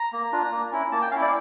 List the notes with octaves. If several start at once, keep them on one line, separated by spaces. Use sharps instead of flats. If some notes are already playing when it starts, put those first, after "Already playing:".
Already playing: A#5
A#3
D4 F4
A#3
C#4 E4
A#3 A5
G5
C#4 E4 F5
D5